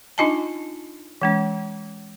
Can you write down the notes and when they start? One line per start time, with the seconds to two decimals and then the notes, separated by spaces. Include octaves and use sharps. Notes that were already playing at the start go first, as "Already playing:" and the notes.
0.18 D4 D#4 F4 D#5 G#5 A5
1.22 E3 G#3 C#4